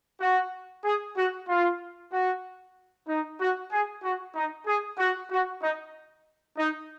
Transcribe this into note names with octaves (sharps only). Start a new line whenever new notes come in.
F#4
G#4
F#4
F4
F#4
D#4
F#4
G#4
F#4
D#4
G#4
F#4
F#4
D#4
D#4